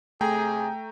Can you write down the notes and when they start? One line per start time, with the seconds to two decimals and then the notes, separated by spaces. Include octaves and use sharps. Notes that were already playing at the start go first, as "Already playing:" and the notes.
0.21 C3 A3 G#4 G5 A#5